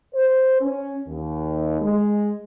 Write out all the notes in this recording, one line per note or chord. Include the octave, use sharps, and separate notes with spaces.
C5
C#4
D#2
G#3